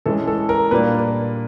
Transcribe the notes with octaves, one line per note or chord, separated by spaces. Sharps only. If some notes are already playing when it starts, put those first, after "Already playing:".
E3 G#3 C#4 A4
A4
A#4
A#2 G3 A#3 D4 B4